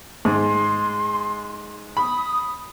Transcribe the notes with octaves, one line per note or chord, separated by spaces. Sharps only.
G#2 G#3 C6
B5 D#6